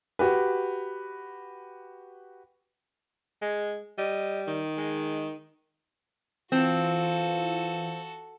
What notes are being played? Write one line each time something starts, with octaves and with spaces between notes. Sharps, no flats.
F#4 G4 B4
G#3
G3 D#5
D#3
G#3
E3 C4 F4 F#4 A4